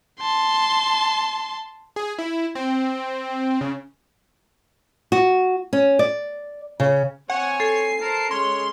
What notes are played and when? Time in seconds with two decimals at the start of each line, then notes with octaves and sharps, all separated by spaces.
0.21 A5 C6
1.96 G#4
2.19 E4
2.55 C4
3.61 C#3
5.12 F#4
5.73 C#4
5.99 D5
6.80 C#3
7.30 C4 C#5 F#5 G#5
7.60 A4 C7
8.01 A#4 C5 A5
8.31 G#3 C#4 C#5 C6